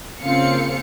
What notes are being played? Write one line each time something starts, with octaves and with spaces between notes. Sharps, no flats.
C#3 A#3 C4 F4 F5 C#7